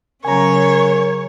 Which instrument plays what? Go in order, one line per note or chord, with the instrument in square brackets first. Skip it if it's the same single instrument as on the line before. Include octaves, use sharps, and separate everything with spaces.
[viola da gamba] C#3 F#3 C#4 [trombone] A#4 [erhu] C#5 [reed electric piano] G#5 A#5